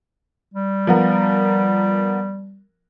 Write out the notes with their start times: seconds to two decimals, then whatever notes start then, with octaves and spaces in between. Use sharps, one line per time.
0.54 G3
0.87 F3 B3 A#4